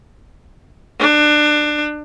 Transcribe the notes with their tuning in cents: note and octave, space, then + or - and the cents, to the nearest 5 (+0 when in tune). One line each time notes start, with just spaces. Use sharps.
D4 +25